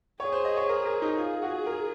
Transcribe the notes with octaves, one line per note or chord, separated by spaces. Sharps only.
G#4 C#5
C5
D#5
C#5
A#4
A#4
D#4
F4 G#4
F#4
A#4